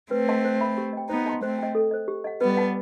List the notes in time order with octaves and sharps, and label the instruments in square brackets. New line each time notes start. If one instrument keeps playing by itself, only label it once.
[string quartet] A3 C4 [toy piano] B4
[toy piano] D#5 F#5 A5 C6
C5
E5 B5
G4
D#5 G5
[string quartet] B3 D#4 [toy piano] C5
[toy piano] D#5 A5 C6
[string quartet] A3 C4 [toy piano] C5
[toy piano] D#5 G5
A4
C5 D#5
G4
D#5 F#5
[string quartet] G3 B3 [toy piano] B4
[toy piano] F#5 A5